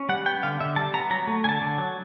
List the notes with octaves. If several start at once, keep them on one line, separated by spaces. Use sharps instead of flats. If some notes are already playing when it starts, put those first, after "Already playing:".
Already playing: C#4
G3 F#5
B3 G5
D3 F5
D3 E5
G3 A5
B3 A#5
F#3 A#5
A3
D3 G#5 A5
D3
F#3